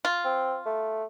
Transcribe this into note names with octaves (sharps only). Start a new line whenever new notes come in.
F4
C4
A3